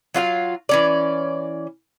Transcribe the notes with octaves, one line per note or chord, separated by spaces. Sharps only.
F#3 F4 F#4 F5
E3 C#4 D5